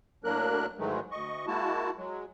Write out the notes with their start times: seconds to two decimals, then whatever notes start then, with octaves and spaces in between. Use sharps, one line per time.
0.24 A2 F#3 A#3 D4 A#4 F#6
0.78 G#2 D#3 E3 F#3 G#3 A3
1.11 D2 D#5 C#6
1.47 G#3 A#3 E4 F#4 A5
1.97 F#3 G#3